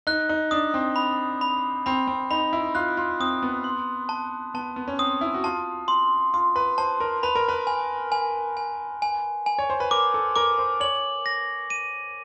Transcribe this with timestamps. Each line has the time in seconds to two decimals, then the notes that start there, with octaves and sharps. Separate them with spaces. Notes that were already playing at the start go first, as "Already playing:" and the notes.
0.07 D#4 F#6
0.29 D#4
0.51 D4 D#6
0.74 C4
0.96 B5
1.41 B5
1.86 C4 B5
2.08 C4
2.31 D#4 B5
2.53 E4
2.75 F4 F#6
2.97 F4
3.20 C4 D#6
3.42 B3
3.64 C6
4.09 A5
4.54 B3 A5
4.76 B3
4.88 C#4
4.99 C4 D#6
5.21 E4
5.34 F#4
5.44 F4 A5
5.88 C6
6.34 F4 C6
6.56 B4
6.78 C5 A5
7.00 A#4
7.23 B4 B5
7.35 A#4
7.48 B4
7.67 G#5
8.12 G#5
8.57 G#5
9.02 G#5
9.46 G#5
9.59 C#5
9.70 C5
9.80 B4
9.91 A#4 D6
10.14 A4
10.36 A#4 D6
10.59 C5
10.80 C#5 F#7
11.26 A#6
11.70 D#7